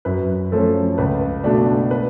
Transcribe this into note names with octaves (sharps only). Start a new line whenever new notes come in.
F#2 B4
F3 A3 C#4 A4
C#2 B4
B2 A3 D4
B4